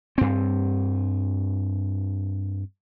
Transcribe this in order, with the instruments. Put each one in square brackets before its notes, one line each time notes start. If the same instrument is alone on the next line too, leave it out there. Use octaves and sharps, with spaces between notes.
[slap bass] G2 C4